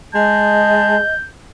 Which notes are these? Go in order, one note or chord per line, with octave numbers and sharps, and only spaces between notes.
G#3 D#5 A5 G6